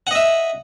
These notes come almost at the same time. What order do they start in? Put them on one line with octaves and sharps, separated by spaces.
F#5 D#5 E5